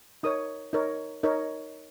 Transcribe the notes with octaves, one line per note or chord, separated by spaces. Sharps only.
D#4 A#4 C#5 D#6
D#4 A#4 C#5
D#4 A#4 C#5